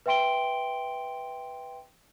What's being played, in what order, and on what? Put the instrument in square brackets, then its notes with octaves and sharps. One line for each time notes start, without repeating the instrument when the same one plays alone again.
[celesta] B4 E5 G5 C6 D7 G7